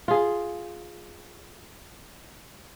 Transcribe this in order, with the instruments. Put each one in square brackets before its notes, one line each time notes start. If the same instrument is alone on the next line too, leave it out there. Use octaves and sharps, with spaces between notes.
[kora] F4 G#4